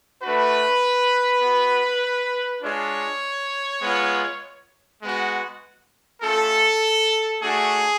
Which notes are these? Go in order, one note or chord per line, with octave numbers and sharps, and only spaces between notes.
A3 D4 F#4 B4
B3 F#4
G#3 D4 F4 C#5
G#3 B3 F4
G#3 B3 F#4
A3 C#4 F4 A4
A3 D4 F#4 G#4